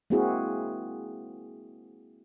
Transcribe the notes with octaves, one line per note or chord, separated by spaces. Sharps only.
G#3 A#3 C4 E4 F#4 G#4